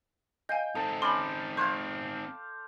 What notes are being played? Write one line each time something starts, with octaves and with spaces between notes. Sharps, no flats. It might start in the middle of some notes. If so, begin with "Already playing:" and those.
D#5 F5 G5 G#5
C4 D#4 A4
C#4 D5 B5 C6
C5 F5 C#6 F#6 G#6